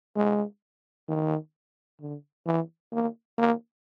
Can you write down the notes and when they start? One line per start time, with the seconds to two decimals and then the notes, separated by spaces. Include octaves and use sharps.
0.16 G#3
1.09 D#3
2.01 D3
2.46 E3
2.92 A#3
3.38 A#3